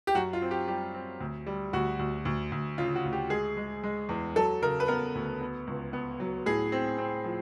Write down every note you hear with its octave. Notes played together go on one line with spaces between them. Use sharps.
G4
F#2 F#4
F4
C4
G4
G3 G4
C4
D2
G3
D2 F#4
D2
D2
D2
C#3 F4
F#4
D2
G4
G#3 G#4
G#3
G#3
E2
F#3 A4
C#3 A#4
B4
B3 A#4
D2
B3
C#2
B3
F#3
A2 G#4
C4
C4
F3